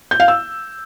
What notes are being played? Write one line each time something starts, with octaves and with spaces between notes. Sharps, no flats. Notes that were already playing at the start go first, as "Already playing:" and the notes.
G6
F5
E6